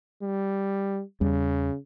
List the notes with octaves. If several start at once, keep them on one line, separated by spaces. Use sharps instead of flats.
G3
E2 C#3 G3